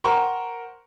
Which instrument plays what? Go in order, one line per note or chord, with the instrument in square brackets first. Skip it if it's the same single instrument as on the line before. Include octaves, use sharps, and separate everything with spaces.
[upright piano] A#4 C5 F#5 G5 A#5 C#6